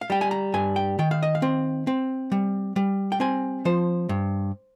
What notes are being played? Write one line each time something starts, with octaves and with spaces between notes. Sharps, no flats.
F5
G3 G5
G#5
A#5
G2 G#5
G5
D#3 G5
F5
D#5
F5
C4
C4
G3
G3
G5
C4 G#5
F3 C5
G2